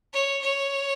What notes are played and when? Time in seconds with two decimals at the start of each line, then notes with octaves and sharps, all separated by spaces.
0.13 C#5
0.42 C#5